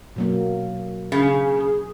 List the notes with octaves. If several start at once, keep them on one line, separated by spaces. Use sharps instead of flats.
B2 F#3 A#3
C#3 G#4